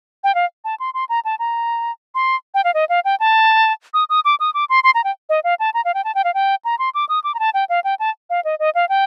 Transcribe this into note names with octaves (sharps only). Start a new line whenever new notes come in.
G5
F5
A5
C6
C6
A#5
A5
A#5
C6
G5
F5
D#5
F5
G5
A5
D#6
D#6
D6
D#6
D6
C6
C6
A#5
G5
D#5
F5
A5
A#5
F5
G5
A5
G5
F5
G5
A#5
C6
D6
D#6
D6
A#5
A5
G5
F5
G5
A5
F5
D#5
D#5
F5
G5